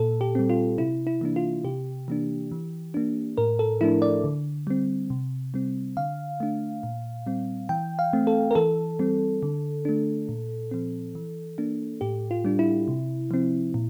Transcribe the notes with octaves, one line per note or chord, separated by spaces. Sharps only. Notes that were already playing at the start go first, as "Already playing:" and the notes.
Already playing: A#2 A4
G4
G3 C4
F4
C3 E4
E4
E3 A#3 D4
F4
C3 G4
E3 A#3 D4
E3
A#3 D4
A2 A#4
A4
F3 A3 D4 E4
D5
D3
G3 C4
C3
G3 C4
D3 F5
A3 D4
A#2
G3 C4
E3 G5
F5
A3 C4
A4
A#4
E3 A4
G3 C4
D3
A3 D4
A#2
F3 C4
E3
A#3 D4
A2 G4
F4
G3 D4
E4
C3
F3 C4
A#2